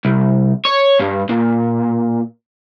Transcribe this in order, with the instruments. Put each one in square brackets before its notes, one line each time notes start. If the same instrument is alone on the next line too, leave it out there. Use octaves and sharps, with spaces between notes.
[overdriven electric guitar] C2
C#5
G2
A#2